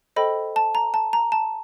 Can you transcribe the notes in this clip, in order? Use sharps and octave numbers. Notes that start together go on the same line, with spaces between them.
A4 C5 D#5 G5 B5
A5
A#5
A5
A#5
A5